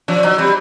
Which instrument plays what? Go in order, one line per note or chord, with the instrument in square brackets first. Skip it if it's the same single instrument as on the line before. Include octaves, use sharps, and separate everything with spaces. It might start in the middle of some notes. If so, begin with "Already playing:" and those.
[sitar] F3 [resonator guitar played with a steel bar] D4
[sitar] F#3 [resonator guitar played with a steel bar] D#4
[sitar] G3 [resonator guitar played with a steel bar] C4